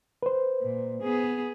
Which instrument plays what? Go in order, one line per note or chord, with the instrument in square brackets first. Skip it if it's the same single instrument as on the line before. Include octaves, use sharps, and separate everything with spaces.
[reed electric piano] B4 C5
[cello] A#2
B3 G#4